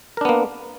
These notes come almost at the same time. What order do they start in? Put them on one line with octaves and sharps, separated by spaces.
A#4 D4 B3 A#3